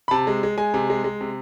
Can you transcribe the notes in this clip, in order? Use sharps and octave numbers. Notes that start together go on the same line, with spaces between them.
B5
C3 A5
G#3
G#3
G#3 G#5
C3
G#3
G#3
C3